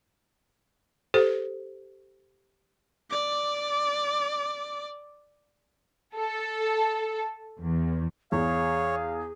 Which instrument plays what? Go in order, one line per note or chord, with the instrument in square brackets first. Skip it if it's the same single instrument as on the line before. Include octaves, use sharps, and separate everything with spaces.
[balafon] G4 A4 C5
[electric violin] D5 D6
[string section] A4
E2
[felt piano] E2 [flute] G#4 [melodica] C#5 [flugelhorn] F5